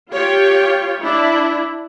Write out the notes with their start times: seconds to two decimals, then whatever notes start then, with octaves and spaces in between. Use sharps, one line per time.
0.11 F4 G4 C#5
1.00 D4 E4